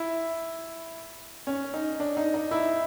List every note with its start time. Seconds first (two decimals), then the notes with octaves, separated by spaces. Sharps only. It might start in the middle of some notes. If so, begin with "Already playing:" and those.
Already playing: E4
1.47 C#4
1.74 D#4
2.00 D4
2.17 D#4
2.34 D#4
2.51 E4